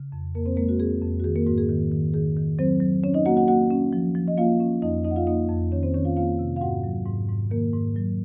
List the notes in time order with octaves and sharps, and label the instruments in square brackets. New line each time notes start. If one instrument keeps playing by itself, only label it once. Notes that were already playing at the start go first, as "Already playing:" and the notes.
Already playing: [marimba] C#3
F2
F2 A#3 A#4
C4 C5
G#3 A#3 A#4
F#4
C4 G#4
F2
F#4
D#3 G#4
A#3 A#4
G#2 F#4
G#4
D#3
D#3
D#3 G#4
D#3
F#3 C4 C5
F#3
C#4 C#5
D#4 D#5
A#3 F#4 F#5
F#4 F#5
A#3 F#4 F#5
C#4
F3
F3
D#5
A#3 F4 F5
C#4
F2 D#4 D#5
F2 D#4 D#5
F#5
F4 F5
A#3 D#4 D#5
F2
D#3 C#4 C#5
C4 C5
D#3 C#4 C#5
F4 F5
A#3 F4 F5
C3
F5
G#2 F#4 F#5
F#3
G#2
G#2
D#3 A#3 A#4
G#2
F#3